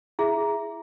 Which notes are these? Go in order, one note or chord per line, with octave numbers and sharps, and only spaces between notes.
E4 G#4 E5